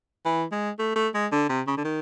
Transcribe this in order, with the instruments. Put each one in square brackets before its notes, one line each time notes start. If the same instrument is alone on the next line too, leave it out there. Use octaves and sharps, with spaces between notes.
[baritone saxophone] E3
G#3
A3
A3
G#3
D3
C3
C#3
D3
D#3